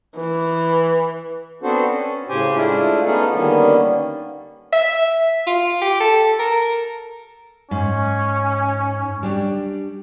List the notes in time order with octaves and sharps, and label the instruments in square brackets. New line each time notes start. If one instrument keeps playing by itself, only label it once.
[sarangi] E3
[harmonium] B3 C4 D4 F#4 A4 C5
C#4
A2 C#3 G4 C5 G5 G#5
G#3 A3 D4 E4 F4
B3 C#4 D#4 F4 G#4 A4
D3 D#3 G3 A#3 B3 C#4
[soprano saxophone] E5
F4
G4
A4
A#4
[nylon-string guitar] G#2 [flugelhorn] C#4
[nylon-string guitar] G3 D4 G4